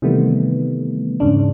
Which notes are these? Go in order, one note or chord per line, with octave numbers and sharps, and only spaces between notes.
C3 D#3 E3 G3 A3 B3
E2 G#2 C#3 D4